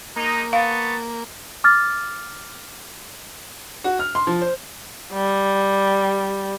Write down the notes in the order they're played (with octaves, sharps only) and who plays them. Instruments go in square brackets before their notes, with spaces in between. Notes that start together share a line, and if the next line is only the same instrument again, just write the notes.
[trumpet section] G#3 D#4 [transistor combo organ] A#3
[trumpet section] B3 A5 C#6 [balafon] F5
[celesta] D6 F6 A6
[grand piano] F#4
F6
C6
F3
C5
[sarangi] G3